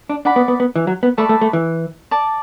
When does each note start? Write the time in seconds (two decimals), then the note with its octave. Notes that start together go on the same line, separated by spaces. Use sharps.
0.09 D4
0.25 D4 D5 F#5 B5
0.36 B3
0.48 B3
0.60 B3
0.76 E3
0.87 F#3
1.03 B3
1.18 A3 B4 D5 A5
1.29 A3
1.41 A3
1.53 E3
2.11 D5 A5 D6